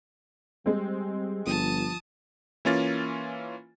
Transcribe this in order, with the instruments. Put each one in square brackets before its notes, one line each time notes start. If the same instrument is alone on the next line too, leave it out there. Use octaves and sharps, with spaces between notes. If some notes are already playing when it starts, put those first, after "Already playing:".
[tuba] G3 [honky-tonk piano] G#3 C4
[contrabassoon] G1 [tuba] F3 [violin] A5 D#6
[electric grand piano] E3 A#3 C#4 F4 A6